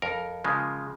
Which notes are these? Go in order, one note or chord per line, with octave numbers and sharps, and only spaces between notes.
F2 A#4
C#3 F3 G#3